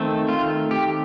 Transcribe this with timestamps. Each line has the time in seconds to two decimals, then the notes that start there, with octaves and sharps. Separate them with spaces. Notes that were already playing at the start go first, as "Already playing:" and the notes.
Already playing: D#3 A3 C4
0.28 F4
0.71 G4